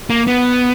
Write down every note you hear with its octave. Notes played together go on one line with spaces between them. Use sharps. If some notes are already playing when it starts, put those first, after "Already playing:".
A#3
B3